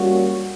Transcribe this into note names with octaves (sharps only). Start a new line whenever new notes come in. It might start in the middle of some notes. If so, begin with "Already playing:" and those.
Already playing: G3 A#3 C#4 F#4